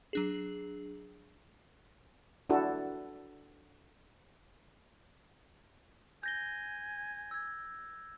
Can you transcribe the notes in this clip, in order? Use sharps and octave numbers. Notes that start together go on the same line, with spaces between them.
F#3 D4 G#4
D4 E4 F#4 A4
G#5 G6 A#6 G7
E6 G#6